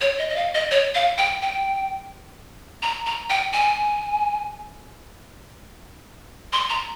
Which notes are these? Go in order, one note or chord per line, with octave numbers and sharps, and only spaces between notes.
C#5
D#5
D#5
F5
D#5
C#5
F5
G5
G5
A#5
A#5
G5
G#5
C6
A#5